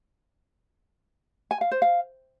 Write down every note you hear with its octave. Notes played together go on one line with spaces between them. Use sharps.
G#5
F5
C5
F5